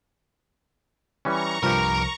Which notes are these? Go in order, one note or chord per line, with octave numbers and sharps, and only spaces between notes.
E3 G3 C#4 A#5 C#6
C2 G2 F3 G4 A#4